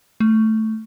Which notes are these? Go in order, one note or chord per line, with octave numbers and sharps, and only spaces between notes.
A3